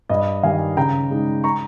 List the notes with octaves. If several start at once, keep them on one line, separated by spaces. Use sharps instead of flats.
G2 D#5
D#3 G3 F5 G#5
C#3 G5 A#5
G#3 D#4
A#5 C#6